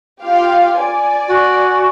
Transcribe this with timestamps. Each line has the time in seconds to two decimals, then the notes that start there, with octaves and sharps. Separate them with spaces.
0.23 F4 G4 F5
0.78 D5 G#5
1.27 F#4